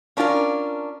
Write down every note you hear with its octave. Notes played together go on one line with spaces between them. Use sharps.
C#4 D4 F4 F#4 A#4